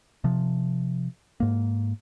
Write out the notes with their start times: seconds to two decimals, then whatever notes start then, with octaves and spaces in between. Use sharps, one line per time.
0.24 C3 F3
1.40 G#2 A#3